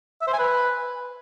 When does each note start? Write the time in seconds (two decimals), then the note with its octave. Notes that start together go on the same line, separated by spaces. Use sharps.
0.22 E5
0.27 C5
0.33 G#5
0.39 B4